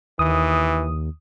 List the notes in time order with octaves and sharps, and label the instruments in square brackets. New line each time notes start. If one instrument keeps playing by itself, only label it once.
[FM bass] D#2 [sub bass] D#3 [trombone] E3 [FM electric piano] D#6